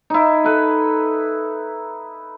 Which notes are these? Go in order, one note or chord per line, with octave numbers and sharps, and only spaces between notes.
D#4 E4
A4 B4